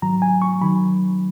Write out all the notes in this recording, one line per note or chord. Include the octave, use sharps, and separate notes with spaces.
G#2 D#3 F#3 A#5
G#5
C#6
D#3 F#3 B5